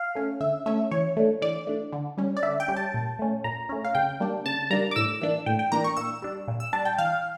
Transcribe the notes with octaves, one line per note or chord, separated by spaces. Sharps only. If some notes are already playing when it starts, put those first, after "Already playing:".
Already playing: F5
A3 C#4
D3 E5
A3 C#4 E5
E3 C#5
A3 D4
E3 D5
A3 D4
D3
G3 C#4
D5
D3 E5
G5
G3 C#4
A5
A#2
A3 C#4
A#2 A#5
A3 C#4
F5
C#3 G5
G3 A#3 D4
C#3 A5
G3 A#3 D4 A#5
D6
A2 E6
E3 A#3 D4
A2 G5
G5
E3 A#3 D4 A#5
C#6
A#2 E6
G3 D4
A#2
E6
G3 D4 A5
G5
E3 F5